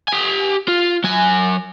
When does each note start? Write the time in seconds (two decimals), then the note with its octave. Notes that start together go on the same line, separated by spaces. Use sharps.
0.08 G4 G#5
0.68 F4
1.04 F#3 G#5